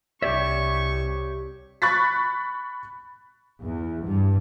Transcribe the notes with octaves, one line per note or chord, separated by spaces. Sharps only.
C2 G4 C#5 D5 E5 C#6
B5 C#6 F#6 A6 B6
E2
G2